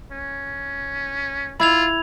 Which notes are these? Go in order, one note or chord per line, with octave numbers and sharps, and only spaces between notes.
C#4
E4 F4 B5 G#6 F7